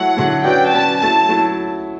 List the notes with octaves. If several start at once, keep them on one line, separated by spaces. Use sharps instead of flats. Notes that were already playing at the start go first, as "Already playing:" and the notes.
Already playing: F#3 A3 E4 F#5
D3 F#3 A3 E4
F#3 C#4 F#4 B4 D5 G5
F#3 C#4 F#4 B4 D5 A5
F#3 A3 E4 A5
F#3 A3 E4